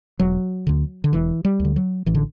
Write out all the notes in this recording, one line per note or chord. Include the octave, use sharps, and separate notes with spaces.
E1 F#3
D2 D3
D3
E1 E3
G3
D2 D3
F#3
A1 E3
D3